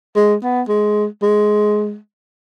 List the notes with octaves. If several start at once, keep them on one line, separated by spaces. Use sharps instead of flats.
G#3
B3
G#3
G#3